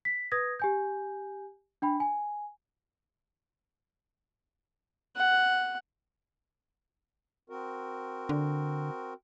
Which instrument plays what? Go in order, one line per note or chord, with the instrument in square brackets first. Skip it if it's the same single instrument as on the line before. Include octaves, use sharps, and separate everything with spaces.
[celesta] B6
B4 D#6 G#6 A#6
G4 G#5 G6
D4 G5 B5
G#5
[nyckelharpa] F#5
[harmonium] C4 F#4 A#4
[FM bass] D3